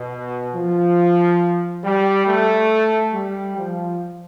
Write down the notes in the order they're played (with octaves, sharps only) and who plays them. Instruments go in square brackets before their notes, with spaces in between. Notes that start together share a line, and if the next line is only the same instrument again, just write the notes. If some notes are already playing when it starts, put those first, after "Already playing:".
Already playing: [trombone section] B2
F3
G3
A3
G3
F3